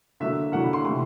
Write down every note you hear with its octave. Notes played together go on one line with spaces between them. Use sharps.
D3 F#3 A#3 E5
D3 F#3 A#3 F#5
B5
C6
C3 E3 A3 C6